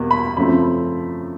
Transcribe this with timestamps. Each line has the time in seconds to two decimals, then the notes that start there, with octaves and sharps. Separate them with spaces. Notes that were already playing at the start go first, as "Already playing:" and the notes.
Already playing: E2 B2 G3 A#3
0.11 B5
0.37 F#2 C#3 F3 A3 C4 B5